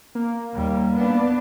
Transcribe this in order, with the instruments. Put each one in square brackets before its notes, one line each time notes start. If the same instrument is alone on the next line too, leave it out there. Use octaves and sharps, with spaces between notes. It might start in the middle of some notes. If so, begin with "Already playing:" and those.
[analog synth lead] A#3
[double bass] D#2 G3
B3 D4